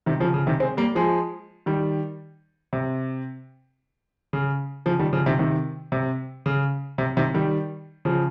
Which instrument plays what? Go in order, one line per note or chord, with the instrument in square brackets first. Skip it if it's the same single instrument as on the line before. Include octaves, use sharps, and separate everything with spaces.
[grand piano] C3 D#3
C#3 F3
C#3
C3 D#3
G#3 C4
G3 A#3
F3 G#3
D#3 G3
C3
C#3
C#3 F3
D#3 G3
C#3 F3
C3 D#3
C3 D#3
C3
C#3
C3
C3 D#3
D#3 G3
C#3 F3